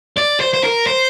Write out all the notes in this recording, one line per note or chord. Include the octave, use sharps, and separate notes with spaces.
D5
C5
C5
A#4
C5